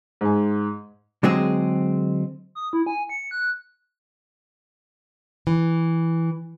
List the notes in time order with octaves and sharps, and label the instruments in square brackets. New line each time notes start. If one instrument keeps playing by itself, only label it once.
[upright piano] G#2 G#5
[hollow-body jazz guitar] D3 F#3 G#3 C4 G#4
[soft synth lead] D#6
E4
G#5
C#7
F#6
[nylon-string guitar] E3